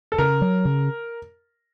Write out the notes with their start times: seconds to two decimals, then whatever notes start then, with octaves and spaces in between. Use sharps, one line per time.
0.12 A4
0.18 C#3 A#4
0.42 F#3
0.65 C#3